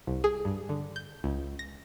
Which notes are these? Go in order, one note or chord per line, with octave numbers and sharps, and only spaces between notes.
C2
G#4
G2
D3
G6
C#2
A#6